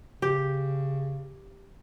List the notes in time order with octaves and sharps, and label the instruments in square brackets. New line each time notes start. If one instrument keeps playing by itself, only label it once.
[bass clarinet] C#3 [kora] G4